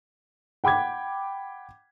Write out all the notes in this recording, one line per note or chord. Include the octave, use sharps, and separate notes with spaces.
F#5 G5 B5 D6 G#6